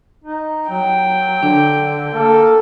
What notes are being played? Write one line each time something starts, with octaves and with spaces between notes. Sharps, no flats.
D#4
F#3 G5
D3 D4
A#3 A4